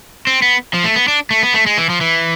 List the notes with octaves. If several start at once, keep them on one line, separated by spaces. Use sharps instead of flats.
C4
B3
F3
A3
B3
D4
A3
B3
A3
G#3
E3
F3
E3